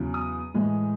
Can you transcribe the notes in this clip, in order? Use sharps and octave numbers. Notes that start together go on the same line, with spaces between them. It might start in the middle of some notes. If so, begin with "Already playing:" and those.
Already playing: E2 C#3 F#3
D#6
A2 E3 G#3